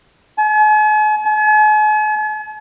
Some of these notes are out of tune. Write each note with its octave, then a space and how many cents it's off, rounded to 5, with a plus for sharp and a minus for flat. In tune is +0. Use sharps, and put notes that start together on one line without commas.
G#5 +45
G#5 +45